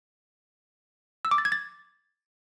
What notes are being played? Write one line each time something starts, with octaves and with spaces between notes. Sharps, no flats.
E6
D6
A6
G#6
A6